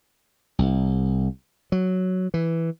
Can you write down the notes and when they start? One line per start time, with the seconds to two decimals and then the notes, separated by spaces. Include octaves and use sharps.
0.59 C2
1.72 F#3
2.34 E3